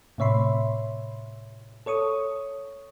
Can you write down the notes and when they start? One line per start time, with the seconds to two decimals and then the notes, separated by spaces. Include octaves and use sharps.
0.18 A2 C3 C#5 E5 B5 C6
1.86 A4 C#5 C#6 D#6